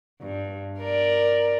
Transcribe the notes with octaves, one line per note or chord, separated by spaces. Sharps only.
G2
A#4 D5